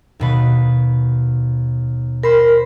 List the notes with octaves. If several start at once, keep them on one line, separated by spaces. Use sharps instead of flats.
D#2 B2 B4
A#4 C5 B5